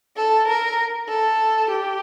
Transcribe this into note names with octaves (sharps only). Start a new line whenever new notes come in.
A4
A#4
A4
G4